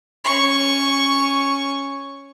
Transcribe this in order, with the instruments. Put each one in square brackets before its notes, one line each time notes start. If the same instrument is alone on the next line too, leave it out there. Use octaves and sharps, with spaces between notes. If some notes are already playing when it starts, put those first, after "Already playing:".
[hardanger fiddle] C#4 C#6